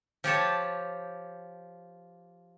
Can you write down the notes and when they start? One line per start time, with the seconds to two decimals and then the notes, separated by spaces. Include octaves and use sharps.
0.24 F3 G4 C#5 A5